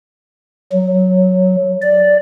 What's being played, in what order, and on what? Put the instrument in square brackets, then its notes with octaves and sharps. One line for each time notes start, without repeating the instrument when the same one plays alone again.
[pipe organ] F#3
D5